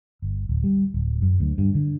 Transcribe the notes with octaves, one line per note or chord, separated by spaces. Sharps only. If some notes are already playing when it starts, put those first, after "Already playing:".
G1
D1
G3
D1
F#2
D2
G2
D3